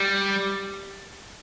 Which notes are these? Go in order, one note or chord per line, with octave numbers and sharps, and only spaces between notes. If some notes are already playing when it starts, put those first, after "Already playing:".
Already playing: G3